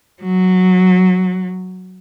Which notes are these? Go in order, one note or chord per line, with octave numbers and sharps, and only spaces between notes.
F#3